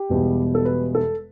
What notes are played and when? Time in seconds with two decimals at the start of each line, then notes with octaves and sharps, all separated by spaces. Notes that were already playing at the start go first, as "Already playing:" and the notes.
Already playing: G4
0.09 E1 E2 B2 G3
0.55 A4
0.65 B4
0.95 A4